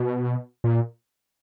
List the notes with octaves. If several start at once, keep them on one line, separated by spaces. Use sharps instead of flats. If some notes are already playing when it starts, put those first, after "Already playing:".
Already playing: B2
A#2